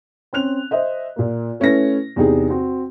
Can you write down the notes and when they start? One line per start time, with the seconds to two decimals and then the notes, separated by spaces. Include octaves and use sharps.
0.33 C4 C#4 F#6 F7
0.71 C5 D#5 E5
1.16 A#2 A#3
1.60 A3 C#4 E4 B4 A#6
2.16 E2 C3 D#4 G4 G#4
2.50 C4 F#4